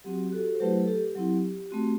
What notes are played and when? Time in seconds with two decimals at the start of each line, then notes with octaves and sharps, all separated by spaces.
0.04 F#3 C4 F#4 G4
0.27 G4
0.32 F#4 A4
0.55 C5
0.60 F#3 A3 E4 G4 B4
0.83 A4
0.88 G4
1.16 F#3 C4 E4
1.71 A3 C4 F#4